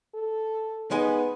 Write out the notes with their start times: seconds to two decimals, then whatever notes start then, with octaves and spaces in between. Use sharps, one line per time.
0.15 A4
0.91 G#3 B3 D#4 G#5